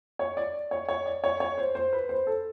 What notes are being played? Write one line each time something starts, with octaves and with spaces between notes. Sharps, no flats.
C#5
D5
C#5
C#5
D5
C#5
C#5
C5
C5
B4
C5
A4